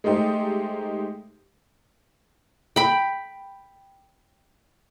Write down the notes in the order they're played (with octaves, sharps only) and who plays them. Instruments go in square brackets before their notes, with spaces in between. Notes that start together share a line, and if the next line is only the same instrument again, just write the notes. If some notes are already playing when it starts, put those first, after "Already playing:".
[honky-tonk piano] G#3 A3 D#4 G4 C5
[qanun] G5 B5